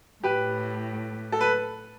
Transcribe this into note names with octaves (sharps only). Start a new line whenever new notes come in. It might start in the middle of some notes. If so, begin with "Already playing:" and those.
A2 G4 B4
A4
B4